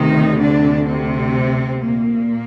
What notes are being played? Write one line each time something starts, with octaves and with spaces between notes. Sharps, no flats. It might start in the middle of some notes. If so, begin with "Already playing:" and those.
Already playing: D2 C3 D#3 D#4
D3 D4
C3 C4
A#2 A#3